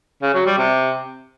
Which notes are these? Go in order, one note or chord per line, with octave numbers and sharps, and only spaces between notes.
C#3
F#3
G3
C3